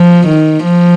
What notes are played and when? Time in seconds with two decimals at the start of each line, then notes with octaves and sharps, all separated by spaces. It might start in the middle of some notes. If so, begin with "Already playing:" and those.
Already playing: F3
0.27 D#3
0.64 F3